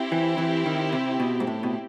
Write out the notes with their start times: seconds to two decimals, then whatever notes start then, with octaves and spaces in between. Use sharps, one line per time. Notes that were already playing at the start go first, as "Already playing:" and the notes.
Already playing: C4 E4 G4
0.12 E3
0.38 E3
0.66 D#3
0.93 C3
1.20 B2
1.40 G#2
1.47 A2
1.63 B2